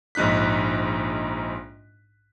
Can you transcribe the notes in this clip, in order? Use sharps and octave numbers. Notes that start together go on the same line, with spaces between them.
A#1 G#2 D#4 F#6 B6